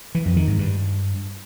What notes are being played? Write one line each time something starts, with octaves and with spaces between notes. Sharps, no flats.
E3
F2
D#3
G#2
G2